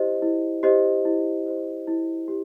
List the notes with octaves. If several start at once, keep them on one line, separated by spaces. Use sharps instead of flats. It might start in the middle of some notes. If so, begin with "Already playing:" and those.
Already playing: E4 G4 C5 D#5
E4
G4 C5 D#5
E4
G4 C5 D#5
E4
G4